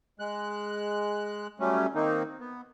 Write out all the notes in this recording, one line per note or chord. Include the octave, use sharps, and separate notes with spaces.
G#3 F#6
F#3 G3 A3 C#4
D#3 A#3 C4 D#4
B3